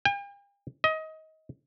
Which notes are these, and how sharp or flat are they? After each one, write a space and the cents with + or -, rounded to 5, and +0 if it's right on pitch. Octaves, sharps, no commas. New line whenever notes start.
G5 +45
D#5 +25